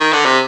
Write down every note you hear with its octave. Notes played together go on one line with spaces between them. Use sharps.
D#3
D3
C3